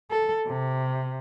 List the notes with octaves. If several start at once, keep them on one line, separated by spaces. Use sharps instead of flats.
A4
C3